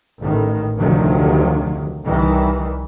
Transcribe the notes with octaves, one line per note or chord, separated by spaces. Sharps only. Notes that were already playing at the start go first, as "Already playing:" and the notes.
A1 A2 D#3
F1 D2 C3 D#3 F3 F#3
C2 D#3 E3